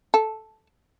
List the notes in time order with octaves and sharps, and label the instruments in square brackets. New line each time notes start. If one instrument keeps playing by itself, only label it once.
[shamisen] A4